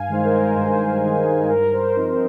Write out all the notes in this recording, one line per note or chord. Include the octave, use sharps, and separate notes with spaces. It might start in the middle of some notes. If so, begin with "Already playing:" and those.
Already playing: G2 F5 G#5
D#3 G#3 D#4 C5
A#4
G2 C5
D#3 G#3 D#4
G2 A#4
C5
F3 C4 D#4 C5